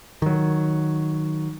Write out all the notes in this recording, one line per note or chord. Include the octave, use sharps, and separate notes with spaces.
D#3 F#3